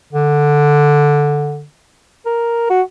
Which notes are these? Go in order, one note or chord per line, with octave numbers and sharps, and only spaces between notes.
D3
A#4
F#4